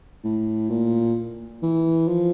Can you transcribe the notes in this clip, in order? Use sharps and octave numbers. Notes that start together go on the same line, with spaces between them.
A2
A#2
E3
F3